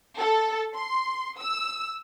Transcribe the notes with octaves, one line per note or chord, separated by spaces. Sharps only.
A4
C6
E6